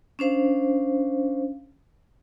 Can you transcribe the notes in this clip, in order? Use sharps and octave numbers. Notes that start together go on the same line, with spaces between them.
C#4 D4 C5 F5